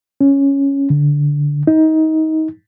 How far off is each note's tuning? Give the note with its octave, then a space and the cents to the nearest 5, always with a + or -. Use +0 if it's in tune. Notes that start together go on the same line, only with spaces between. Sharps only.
C#4 +0
D3 -10
D#4 +25